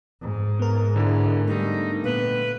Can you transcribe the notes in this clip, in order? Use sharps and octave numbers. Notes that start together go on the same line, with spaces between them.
G#2
B3 A#4
D3 G#3 E4
D3 G3 A3 D#4
A#2 B3 B4